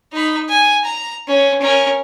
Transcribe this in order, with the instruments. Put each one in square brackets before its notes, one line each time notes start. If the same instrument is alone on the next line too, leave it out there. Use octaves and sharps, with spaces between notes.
[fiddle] D#4 B5
G#5
A#5
C#4
C#4 A#4